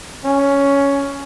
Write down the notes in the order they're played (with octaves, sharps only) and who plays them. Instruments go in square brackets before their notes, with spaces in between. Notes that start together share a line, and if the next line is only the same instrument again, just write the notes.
[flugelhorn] C#4